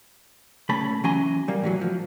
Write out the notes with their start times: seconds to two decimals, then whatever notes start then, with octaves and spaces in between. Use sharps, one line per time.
0.69 A#2 C#3 A3 C#4 A5 B5
1.04 E3 F#3 C#4 G#5 A#5 C6
1.48 A#2 G3 A#3
1.64 A2 E3 F#3
1.81 F3